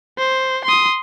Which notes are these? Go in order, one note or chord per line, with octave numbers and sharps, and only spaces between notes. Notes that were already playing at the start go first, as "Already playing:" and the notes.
C5
C6 D#6